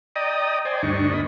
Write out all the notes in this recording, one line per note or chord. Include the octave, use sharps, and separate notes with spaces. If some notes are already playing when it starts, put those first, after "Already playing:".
D5 D#5 G5 A#5 D#6
C5 D5 G5 G#5
D2 G2 D4 D#4 C#6
A#3 D#5 B5